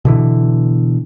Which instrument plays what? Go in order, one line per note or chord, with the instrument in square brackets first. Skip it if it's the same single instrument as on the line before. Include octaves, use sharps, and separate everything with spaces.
[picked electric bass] B2 D3 E3